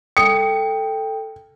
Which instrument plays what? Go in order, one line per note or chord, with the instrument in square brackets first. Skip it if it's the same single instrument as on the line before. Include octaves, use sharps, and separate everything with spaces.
[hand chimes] A4 G5 [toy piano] D#6 [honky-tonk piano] C#7